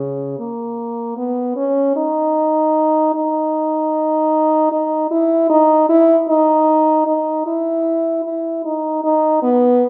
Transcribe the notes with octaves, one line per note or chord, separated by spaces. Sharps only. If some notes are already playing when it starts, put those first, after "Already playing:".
Already playing: C#3
A#3
B3
C#4
D#4
D#4
D#4
E4
D#4
E4
D#4
D#4
E4
E4
D#4
D#4
B3